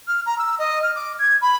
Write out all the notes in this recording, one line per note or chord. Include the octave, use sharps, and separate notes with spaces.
F6
A#5
E6
D#5
F6
D6
G#6
B5